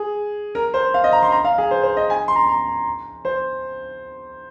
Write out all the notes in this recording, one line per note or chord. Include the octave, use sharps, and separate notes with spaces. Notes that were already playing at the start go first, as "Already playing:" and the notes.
Already playing: G#4
A#4
C5
F5
D#5
A#5
C6
A#5
F5
G#4
C5
C5
D#5
G#5
C6
A#5
A#5
C5